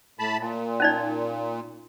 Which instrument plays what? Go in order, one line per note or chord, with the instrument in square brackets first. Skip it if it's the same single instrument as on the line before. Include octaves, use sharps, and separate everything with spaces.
[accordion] A2 A5 B5
A#2
[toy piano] C#4 D#4 D5